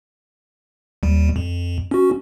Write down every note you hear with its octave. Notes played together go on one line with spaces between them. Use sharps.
D#2 G3
F2
C#4 F#4